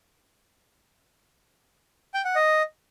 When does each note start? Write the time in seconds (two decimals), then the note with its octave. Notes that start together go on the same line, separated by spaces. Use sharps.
2.14 G5
2.25 F#5
2.35 D#5